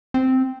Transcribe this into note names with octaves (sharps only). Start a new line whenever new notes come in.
C4